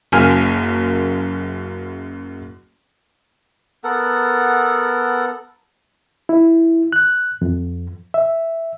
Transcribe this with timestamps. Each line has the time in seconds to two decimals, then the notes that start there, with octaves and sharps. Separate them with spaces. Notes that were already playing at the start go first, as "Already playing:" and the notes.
0.12 F#1 F#2 A#3 A#4 G#5 F6
3.84 B3 A4 A#4 F#5
6.29 E4
6.93 F#6
7.42 F2
8.14 E5